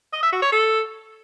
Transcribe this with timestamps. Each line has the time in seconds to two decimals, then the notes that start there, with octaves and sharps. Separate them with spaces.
0.13 D#5
0.23 E5
0.33 F#4
0.42 C#5
0.52 A4